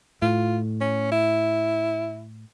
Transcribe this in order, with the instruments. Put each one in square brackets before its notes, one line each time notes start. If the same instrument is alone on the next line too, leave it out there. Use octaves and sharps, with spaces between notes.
[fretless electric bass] A2 [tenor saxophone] F4
[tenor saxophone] C#4
E4